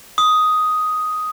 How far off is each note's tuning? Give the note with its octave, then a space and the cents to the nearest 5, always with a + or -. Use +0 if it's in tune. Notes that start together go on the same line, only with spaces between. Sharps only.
D#6 +5